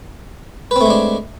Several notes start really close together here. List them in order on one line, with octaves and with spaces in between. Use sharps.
B4 C4 A3 G#3 D4